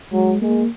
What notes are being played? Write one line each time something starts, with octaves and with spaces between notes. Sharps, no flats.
F#3 G#3
G#3 A#3